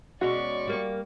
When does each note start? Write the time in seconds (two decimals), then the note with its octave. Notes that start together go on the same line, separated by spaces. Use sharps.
0.21 B2 G#3 C#4 F#4 D5 C#6
0.67 G3 A#3